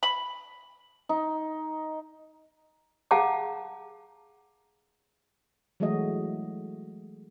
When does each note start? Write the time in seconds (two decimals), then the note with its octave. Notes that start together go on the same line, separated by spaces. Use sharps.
0.03 B5
1.09 D#4
3.11 G#4 F5 F#5 A5 A#5 D6
5.80 E3 F#3 G#3 A3 F#4 D#5